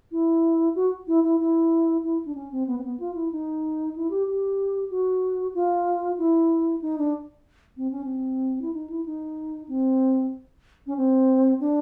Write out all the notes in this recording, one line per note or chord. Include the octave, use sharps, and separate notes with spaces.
E4
F#4
E4
E4
E4
E4
D4
C#4
C4
B3
C4
B3
F4
E4
D#4
E4
G4
G4
F#4
F4
E4
D#4
D4
C4
C#4
C4
E4
D#4
E4
D#4
C4
C#4
C4
D4